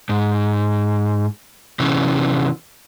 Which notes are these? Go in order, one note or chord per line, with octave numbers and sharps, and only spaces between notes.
G#2
C3 E3 C#4